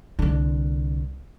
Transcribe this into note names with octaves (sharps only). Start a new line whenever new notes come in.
C2 D3